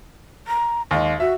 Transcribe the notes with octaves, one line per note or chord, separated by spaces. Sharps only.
A#5
D#2 G#3 F5
F#4 E5